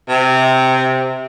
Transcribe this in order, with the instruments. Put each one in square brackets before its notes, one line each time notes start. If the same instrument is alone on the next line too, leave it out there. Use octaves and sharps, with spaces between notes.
[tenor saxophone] C3